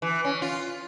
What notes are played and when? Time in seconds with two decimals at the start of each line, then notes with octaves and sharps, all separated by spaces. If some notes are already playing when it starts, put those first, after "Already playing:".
0.02 E3
0.24 C#4
0.42 F4